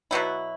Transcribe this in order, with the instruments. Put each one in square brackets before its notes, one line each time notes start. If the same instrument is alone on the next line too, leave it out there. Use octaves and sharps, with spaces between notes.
[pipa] B2 F#3 B3 E4